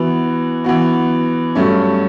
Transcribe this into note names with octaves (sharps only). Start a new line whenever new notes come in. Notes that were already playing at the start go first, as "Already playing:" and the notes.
Already playing: E3 B3 F#4
E3 B3 F#4
G2 F#3 A3 C#4